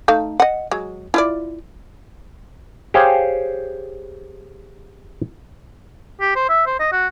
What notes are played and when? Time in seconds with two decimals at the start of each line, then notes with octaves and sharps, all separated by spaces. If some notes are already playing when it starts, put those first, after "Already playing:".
0.08 A3 D#4 F5
0.40 D#5 F#5
0.71 F#3 G#3
1.14 E4 F4 D5
2.94 G4 G#4 C5 C#5 F5 G5
6.21 G4
6.36 C5
6.49 E5
6.66 C5
6.80 D#5
6.92 F#4